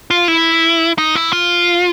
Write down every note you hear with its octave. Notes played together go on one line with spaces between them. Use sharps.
F4
E4
D#4
E4
F4